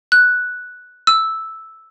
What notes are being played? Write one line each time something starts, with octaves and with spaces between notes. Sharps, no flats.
F#6
E6